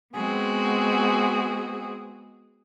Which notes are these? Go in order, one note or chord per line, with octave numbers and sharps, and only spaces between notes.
G#3 B3 C4 F#4 G#4